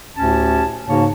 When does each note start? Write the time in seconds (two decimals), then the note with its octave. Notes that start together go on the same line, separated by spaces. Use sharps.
0.16 D2 A2 C#4 G4 A5
0.87 G#2 C#3 A#3 F#4 C#5 A5